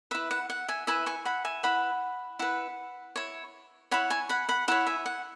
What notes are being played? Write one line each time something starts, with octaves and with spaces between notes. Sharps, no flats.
E4 B4 E5
F#5
F#5
E5 G#5
E4 B4 E5 G#5
G#5 C#6
F#5 B5
E5 G#5
E4 B4 F#5 B5
E4 B4 F#5
E4 C#5
E4 C#5 F#5 B5
G#5 C#6
F#5 B5
F#5 B5
E4 C#5 F#5 B5
E5 G#5
F#5